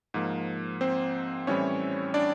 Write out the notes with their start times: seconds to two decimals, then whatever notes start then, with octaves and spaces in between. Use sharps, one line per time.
0.14 G#2 F3 A#3
0.81 C4 C5
1.47 A2 E3 G3 C4 C#4 E4 C#5
2.14 D4 D5